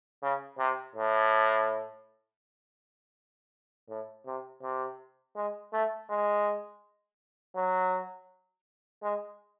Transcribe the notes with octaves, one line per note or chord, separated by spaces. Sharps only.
C#3
C3
A2
A2
C3
C3
G#3
A3
G#3
F#3
G#3